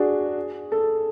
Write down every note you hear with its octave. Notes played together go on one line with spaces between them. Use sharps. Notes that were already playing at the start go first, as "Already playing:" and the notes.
Already playing: D4 F#4 G#4
A4